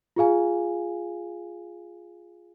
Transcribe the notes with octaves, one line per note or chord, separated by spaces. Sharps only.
F4 G#4 F5 G#5